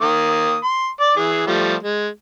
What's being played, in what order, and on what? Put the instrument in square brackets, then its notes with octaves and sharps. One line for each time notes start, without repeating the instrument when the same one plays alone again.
[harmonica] D#3 A#3 D#6
C6
D5 D6
E3 G#4
F3 G3 A3
G#3